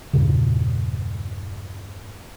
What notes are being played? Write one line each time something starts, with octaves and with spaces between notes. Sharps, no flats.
E2 G2 A#2 C#3